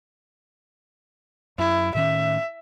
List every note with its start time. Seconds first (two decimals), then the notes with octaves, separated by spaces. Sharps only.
1.58 F#2 E4
1.95 A2 D#3 C#4 E5